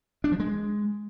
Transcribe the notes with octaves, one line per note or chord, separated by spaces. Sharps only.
D4
F3
G#3